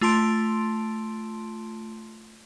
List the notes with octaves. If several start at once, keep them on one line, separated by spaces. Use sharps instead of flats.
A3 F4 A5 C6 D7